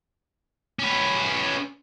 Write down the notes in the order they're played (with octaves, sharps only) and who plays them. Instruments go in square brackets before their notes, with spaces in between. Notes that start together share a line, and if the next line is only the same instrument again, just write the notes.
[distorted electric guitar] C#4 B4